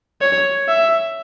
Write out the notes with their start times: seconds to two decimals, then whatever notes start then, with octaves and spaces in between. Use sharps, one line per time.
0.21 C#5
0.68 E5